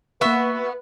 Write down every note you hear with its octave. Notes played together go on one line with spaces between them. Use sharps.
A#3 B3 F#4 B4 E5 F#6